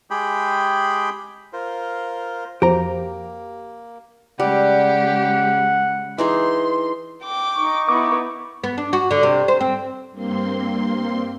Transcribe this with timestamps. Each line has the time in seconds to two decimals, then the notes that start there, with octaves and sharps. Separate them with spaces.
0.11 G#3 G4 G#4 G5 B5
1.53 F4 A#4 C5
2.62 F2 A#3 F#4 G4 C5 A#5
4.40 C#3 G3 G#3 G4 F#5
6.18 E3 D#4 G#4 C6
7.23 G5 D6
7.55 D#4 C#6
7.89 B3 E4 D6
8.64 B3
8.78 D4
8.93 F#4
9.11 D3
9.23 C3
9.48 C5
9.61 C4
10.11 G2 A#3 C4 C6